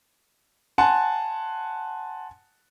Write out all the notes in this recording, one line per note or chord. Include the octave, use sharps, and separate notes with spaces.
F#5 G#5 A5 C6